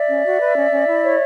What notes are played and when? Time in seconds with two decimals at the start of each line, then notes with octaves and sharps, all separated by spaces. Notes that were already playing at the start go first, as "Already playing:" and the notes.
Already playing: D5 E5
0.08 C#4
0.25 F#4
0.40 B4
0.56 C#4
0.71 C#4
0.86 E4
1.03 C#5